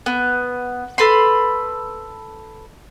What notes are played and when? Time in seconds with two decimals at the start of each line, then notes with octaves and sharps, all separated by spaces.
0.06 B3
0.98 A4 B4 B5 C6